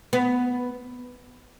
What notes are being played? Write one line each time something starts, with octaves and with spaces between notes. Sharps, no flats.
B3